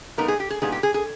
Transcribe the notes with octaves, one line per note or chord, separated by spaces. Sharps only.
A#2 G3 B3 D#4 A#4
G#4
G4
G#4
A#2 G3 B3 D#4 G#4
G4
G#4
G#4